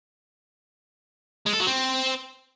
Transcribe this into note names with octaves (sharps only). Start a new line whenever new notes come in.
G#3
A4
F#3
C4